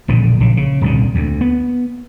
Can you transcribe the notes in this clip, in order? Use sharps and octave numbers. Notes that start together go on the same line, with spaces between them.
E1 A#1 A#2 D3
A#1 C#3
C#3
D#1 C2 D3
D2
B3